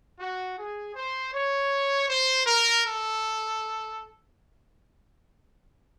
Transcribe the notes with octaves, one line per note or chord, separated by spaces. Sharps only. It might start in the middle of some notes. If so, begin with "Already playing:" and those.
F#4
G#4
C5
C#5
C5
A#4
A4